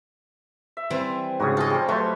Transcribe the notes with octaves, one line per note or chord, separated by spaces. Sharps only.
E5
E3 G3 C4 E5 C6
G#2 C#3 F#4 C#5 D#6
F4 G#4 A4 C#5 D#5
G3 G4 C5
F#3 A3 B4 C5 A5 C#6